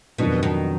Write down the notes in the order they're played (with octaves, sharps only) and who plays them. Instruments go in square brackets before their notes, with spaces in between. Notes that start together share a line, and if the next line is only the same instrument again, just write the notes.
[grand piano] F2 D#3 F#3 D4 [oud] B2
[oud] B2 D#3